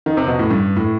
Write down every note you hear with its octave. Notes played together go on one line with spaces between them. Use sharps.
D#3
C3
B2
A2
G2
A2